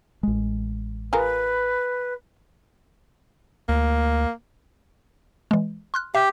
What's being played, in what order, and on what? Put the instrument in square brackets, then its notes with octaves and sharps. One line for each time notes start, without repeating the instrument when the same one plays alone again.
[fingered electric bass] A1 G#3
[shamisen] F4 G#4 A#4 [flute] B4
[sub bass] D2 [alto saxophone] A#3
[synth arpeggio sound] E3 G#3
C6 F6 F#6
[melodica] G4 [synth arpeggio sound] E5